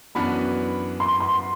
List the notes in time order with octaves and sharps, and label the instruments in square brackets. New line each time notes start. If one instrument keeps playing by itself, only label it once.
[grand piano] F#2 E3 B3 D4 F#4 [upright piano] B5
[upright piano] C6
C6